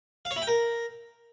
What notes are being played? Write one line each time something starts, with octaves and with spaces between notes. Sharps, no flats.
F5
C#5
E4
G5
A#4